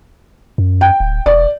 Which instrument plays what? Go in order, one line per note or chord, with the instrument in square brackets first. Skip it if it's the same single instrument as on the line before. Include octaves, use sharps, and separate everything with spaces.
[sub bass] F#2
[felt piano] G5
[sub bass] D1
[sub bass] E1 [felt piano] D5